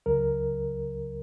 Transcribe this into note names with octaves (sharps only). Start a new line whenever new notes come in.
C#2 C#3 F#3 A#4